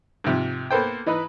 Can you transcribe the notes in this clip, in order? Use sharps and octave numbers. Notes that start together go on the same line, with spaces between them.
G#2 C3 F3
A#3 B3 A4 C5 G5
E3 D#4 B4